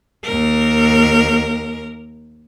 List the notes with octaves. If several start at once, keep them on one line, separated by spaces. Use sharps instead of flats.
D#2 A#4